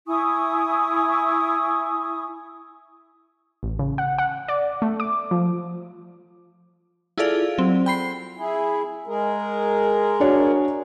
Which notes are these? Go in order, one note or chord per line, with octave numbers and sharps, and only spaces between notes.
E4 G#5 C#6 D#6
A1
C#3
F#5
F#5
D5
A3
D6
F3
E4 F4 G#4 A4 D5 F5
F#3 C4
G5 B5 C7
E4 G#4
G#3 G#4 A#4
D4 F#4 C#5